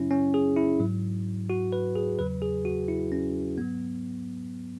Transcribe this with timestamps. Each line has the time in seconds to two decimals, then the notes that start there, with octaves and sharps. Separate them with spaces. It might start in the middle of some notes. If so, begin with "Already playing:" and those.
Already playing: F#2 C#3 F#3 C#4 E4
0.11 C#4
0.34 G#4
0.56 E4
0.80 G#2 F#3
1.50 F#4
1.73 B4
1.95 G#4
2.19 E2 C#3 F#3 B4
2.42 G#4
2.65 F#4
2.88 E4
3.12 C#4
3.58 G#2 F#3 B3